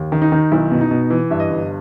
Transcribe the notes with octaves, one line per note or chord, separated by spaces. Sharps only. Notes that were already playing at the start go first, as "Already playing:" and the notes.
Already playing: D#2
D#3
D#4
D#3
B1 E4
B2
D#4
B2
E3
G2 E5
D#5
G1